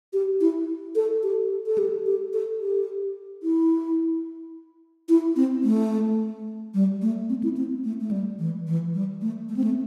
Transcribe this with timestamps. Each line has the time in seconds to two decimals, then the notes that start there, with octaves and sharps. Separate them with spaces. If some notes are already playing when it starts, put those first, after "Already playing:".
0.13 G4
0.41 E4
0.95 A4
1.23 G4
1.67 A4
1.78 G4
2.06 G4
2.33 A4
2.61 G4
3.43 E4
5.09 E4
5.36 C4
5.64 A3
6.74 G3
7.02 A3
7.29 C4
7.43 E4
7.57 C4
7.84 A3
8.01 A3
8.11 G3
8.39 E3
8.67 E3
8.94 G3
9.22 A3
9.49 A3
9.57 C4
9.64 A3